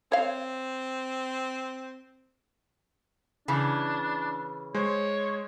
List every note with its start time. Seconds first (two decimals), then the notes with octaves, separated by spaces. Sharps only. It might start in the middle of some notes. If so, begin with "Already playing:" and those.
0.12 C4 C#5 F5
3.48 C#3 E3 D4
4.75 G#3 C5 C#5